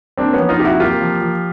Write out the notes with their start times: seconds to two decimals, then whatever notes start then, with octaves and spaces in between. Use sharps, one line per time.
0.17 A#3 C4 D4
0.33 B3 C#4
0.39 F3
0.49 D#4 F4
0.59 C3 G4
0.65 E4 F#4
0.80 A#3 F4 G4
1.01 F3
1.21 F3